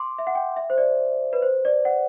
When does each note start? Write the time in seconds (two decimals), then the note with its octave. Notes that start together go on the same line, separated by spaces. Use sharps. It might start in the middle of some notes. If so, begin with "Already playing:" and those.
Already playing: C6 D6
0.19 E5
0.27 F#5
0.35 G5
0.57 E5
0.70 C5
0.78 D5
1.33 B4
1.42 C5
1.65 D5
1.85 F#5